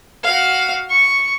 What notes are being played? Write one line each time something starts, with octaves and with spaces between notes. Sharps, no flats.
F#4 F5
C#6